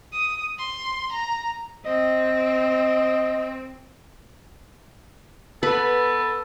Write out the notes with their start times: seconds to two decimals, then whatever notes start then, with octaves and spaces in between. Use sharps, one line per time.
0.13 D#6
0.58 C6
1.12 A#5
1.86 C4 D#5
5.63 B3 A4 B4